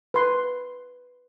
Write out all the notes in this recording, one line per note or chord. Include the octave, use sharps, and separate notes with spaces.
B4 C6